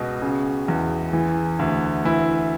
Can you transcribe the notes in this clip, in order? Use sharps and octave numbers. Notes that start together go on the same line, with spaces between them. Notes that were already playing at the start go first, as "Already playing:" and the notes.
Already playing: C#2 B2
C#3
E2
E3
D2
E3 E4